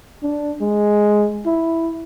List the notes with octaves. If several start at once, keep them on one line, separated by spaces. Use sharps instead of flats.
D4
G#3
E4